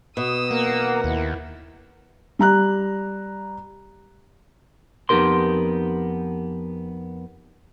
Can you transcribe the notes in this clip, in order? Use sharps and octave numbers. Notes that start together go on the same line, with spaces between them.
B2 D#6 E6
A#3 A#4 F#5
D#2 E4
G3 A#5 F#6
F2 B3 D#4 G4 A#4 C6